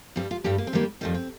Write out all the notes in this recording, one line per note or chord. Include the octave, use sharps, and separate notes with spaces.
G2 G3 C4
F4
G2 G3 G4
A#3
C4
F2 D#3 G3 A#3
F2 D#3 G3 G4
C4